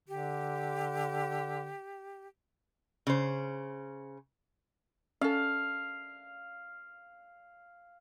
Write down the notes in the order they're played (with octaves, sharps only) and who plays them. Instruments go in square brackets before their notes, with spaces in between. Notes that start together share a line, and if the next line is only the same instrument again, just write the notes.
[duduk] D3 [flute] G4
[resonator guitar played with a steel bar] C#3 C5
[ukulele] C#4 A4 [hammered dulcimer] F5